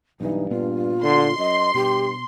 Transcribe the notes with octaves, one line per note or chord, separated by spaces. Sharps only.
B1 G2 E3 D#4
A#2 B3 D4 F4
D3 C6
F#2 D#5
G2 B2 G4